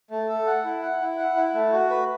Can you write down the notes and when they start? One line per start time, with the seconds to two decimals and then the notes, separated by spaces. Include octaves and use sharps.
0.11 A3
0.29 A4
0.46 F#5
0.64 E4
0.82 F#5
1.01 E4
1.18 F#5
1.36 E4
1.53 A3
1.72 F#4
1.90 B4